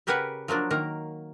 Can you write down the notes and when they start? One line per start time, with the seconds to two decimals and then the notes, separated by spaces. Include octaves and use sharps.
0.07 C#3 G4 A#4 B4 F#5 G#5
0.48 F3 F#3 A#3 D4
0.71 D#3 A#3 A#5